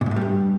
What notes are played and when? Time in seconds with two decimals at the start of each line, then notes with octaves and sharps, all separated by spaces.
0.01 A#2
0.06 G#2
0.11 A2
0.16 G3
0.21 G2